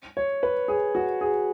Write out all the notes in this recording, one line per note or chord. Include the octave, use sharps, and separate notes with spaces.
C#5
B4
G#4
F#4
G#4